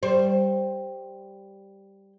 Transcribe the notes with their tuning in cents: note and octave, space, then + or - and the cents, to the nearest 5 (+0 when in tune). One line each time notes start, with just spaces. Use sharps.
G3 +0 C5 +0